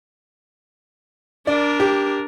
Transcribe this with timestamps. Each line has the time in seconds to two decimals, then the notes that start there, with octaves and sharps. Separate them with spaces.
1.47 D4 A#4 D5
1.80 G4